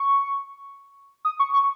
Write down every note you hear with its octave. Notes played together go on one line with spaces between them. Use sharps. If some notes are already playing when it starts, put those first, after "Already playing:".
Already playing: C#6
D#6
C#6
C#6